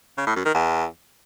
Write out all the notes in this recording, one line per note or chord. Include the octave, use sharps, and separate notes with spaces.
C#3
A2
F#2
D#3
E2